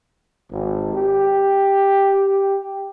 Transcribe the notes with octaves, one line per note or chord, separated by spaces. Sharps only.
G#1
G4